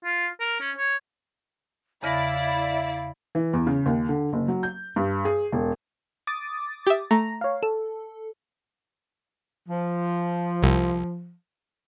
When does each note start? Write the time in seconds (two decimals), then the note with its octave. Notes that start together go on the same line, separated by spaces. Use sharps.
0.04 F4
0.40 A#4
0.60 C#4
0.77 C#5
2.03 E2 C#3 E4 D5 F5 A#6
3.35 E3
3.53 E2
3.67 C#3
3.86 D#2
4.09 D3
4.33 F#1
4.48 F#3
4.63 G6
4.96 G2
5.25 G#4
5.52 E1
6.27 D6 D#6 A6
6.87 G4 E5
7.11 A3 A#5
7.41 C#5 F5
7.63 A4 E7
9.69 F3
10.63 C2